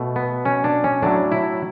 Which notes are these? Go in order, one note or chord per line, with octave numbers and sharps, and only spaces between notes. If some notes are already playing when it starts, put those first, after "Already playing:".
Already playing: B2 A3
B3
C#4
D4
C#4
A2 F#3 A3 D4
E4